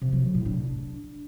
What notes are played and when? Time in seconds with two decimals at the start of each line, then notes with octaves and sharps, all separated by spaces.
0.02 C3
0.13 F#3
0.23 D3
0.34 A2
0.45 D4